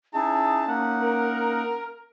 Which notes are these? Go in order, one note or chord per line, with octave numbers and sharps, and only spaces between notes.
C#4 D#4 E4 G#4 A5
A#3 D#4 F#5
A#4